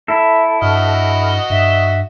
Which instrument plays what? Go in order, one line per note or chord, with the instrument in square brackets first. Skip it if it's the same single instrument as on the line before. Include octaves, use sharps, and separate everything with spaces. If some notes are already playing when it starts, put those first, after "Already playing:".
[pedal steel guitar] E4 A4 [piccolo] E5
[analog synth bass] G2 [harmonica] F#4 D#5 [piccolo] F6
[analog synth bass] G2 [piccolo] E5